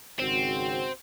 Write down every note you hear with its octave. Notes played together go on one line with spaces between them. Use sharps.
G#1 C#3 C4 F#4